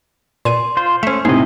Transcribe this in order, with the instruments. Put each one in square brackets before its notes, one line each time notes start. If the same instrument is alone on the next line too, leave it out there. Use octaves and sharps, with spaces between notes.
[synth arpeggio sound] A#2 G#5 D#7 [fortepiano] D5 [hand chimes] C6
[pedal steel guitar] F4 C5
[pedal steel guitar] A3 C#4 [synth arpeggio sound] C5 E5
[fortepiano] A2 C3 [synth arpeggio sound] D#4 [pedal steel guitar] G#4 D#5